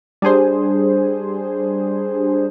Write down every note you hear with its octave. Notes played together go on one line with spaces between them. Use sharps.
G3 D4 G#4 C5